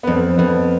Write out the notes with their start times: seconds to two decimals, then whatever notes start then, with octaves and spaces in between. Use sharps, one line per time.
0.03 B3
0.07 F2 C4
0.38 F2 B3